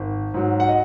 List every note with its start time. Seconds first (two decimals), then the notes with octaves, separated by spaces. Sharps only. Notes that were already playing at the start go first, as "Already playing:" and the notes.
Already playing: G#1
0.34 G#2 F#3
0.60 F#5
0.69 D#5